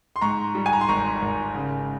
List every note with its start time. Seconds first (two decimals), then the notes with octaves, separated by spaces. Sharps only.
0.16 C6
0.21 G#2 A#5 C#6
0.55 G3
0.66 G#5
0.73 A#5
0.81 C6
0.88 G#1 A#5 C#6
1.22 G#1
1.55 C#3